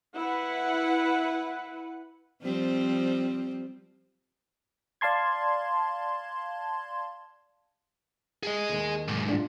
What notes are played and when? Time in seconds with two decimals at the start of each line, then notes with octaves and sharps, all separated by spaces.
0.16 E4 B4 F#5
2.42 F3 G3 C4
5.01 D5 F5 A5 C6 G#6
8.43 G#4 D#5
8.69 D#2 D#3
9.08 B1 G#2
9.28 D4 F4